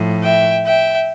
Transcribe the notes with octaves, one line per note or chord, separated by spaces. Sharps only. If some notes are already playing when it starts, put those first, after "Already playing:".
Already playing: A2 F3
E5 G5
E5 G5